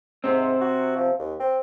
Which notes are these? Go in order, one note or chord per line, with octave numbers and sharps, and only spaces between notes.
G#2 C3 C4
F#4
F3
D#2
C4